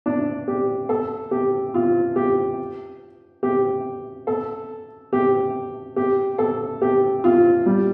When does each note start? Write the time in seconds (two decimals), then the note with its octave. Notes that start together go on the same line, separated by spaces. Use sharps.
0.06 D4
0.48 G4
0.89 A4
1.31 G4
1.74 F4
2.16 G4
3.43 G4
4.27 A4
5.13 G4
5.96 G4
6.38 A4
6.82 G4
7.24 F4
7.66 G3